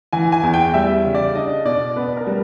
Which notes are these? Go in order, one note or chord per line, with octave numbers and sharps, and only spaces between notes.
E3 G#5
G#5
E2
G5
G3 E5
C#3
D5
D4 D#5
B2 D5
B3 B4
A#4
G3